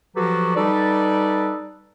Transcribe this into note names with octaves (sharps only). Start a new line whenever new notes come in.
F3 F#3 F#4 G4 A4 B4
G3 D#4 A4 B4 D5